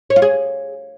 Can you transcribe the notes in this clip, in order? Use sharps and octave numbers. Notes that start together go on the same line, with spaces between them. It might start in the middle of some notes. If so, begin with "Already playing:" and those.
C#5
F4
G#4